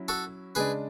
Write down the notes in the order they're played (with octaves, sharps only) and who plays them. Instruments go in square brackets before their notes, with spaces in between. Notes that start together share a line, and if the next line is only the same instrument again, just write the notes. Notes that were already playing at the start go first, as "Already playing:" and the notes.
Already playing: [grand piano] F#3 C#4 E4
[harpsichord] F#4 A4
[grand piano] C#3 G#3 D4 [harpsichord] G#4 B4